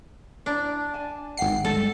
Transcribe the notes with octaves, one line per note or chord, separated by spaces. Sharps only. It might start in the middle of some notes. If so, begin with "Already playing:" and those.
D4 E4 D5 A#5
D5 G#5 A5
G#1 E5 F#5 G5 C7
G3 G#3 A4